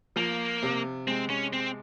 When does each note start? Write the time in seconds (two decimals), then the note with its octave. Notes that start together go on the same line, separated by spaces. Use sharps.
0.16 F3 A#3
0.63 C3
1.07 G#3 C4
1.30 C#4
1.53 G#3 C4